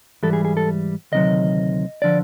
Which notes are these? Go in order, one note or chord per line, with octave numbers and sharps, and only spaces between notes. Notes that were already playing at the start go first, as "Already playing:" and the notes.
G#2 E3 G3 A4
G#4
G#4
A4
D2 C3 D#3 F#3 D#5
D3 F3 D5